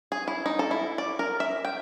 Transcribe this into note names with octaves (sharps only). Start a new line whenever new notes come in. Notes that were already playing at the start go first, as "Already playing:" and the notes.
G#4
E4
D#4
A4
E4
D5
A#4
E5
G5